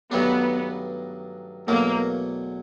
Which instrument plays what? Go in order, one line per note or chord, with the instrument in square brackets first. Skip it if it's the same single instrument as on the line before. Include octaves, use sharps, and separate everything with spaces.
[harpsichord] G2 D#3 F#3 A3 D4 [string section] B3
[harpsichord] E2 B2 F#3 A3 [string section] A#3